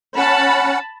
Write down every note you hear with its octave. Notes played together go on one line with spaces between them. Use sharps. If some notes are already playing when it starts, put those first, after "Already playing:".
C#4 F#5 A5 B5